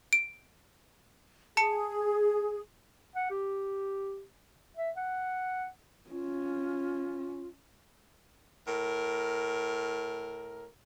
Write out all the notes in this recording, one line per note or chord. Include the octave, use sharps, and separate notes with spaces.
D7
G#4 A5 C#7
F#5
G4
E5
F#5
C#4 F4
A2 A#4